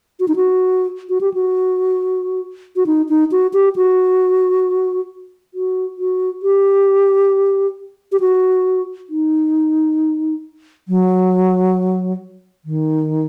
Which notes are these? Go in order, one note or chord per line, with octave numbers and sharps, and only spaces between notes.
F#4
D#4
F#4
F#4
G4
F#4
F#4
D#4
D#4
F#4
G4
F#4
F#4
F#4
G4
G4
F#4
D#4
F#3
D#3